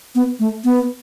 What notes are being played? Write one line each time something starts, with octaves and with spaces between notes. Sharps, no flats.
B3
A3
B3